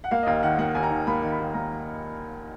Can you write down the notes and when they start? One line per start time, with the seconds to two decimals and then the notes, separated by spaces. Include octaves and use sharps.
0.04 F#5
0.11 A#3 F5
0.23 D#5
0.26 D#2 F5
0.43 D#3 F#5
0.59 A#3 F#5
0.75 D#2 G#5
0.83 A#5
0.91 D#3
1.07 A#3 B5
1.22 D#3
1.31 B5
1.39 D#2
1.54 A#3 A#5